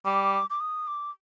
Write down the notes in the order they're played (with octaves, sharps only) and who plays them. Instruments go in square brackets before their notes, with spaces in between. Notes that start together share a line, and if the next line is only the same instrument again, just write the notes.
[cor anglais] G3 [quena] D6
[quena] D6
D#6
D6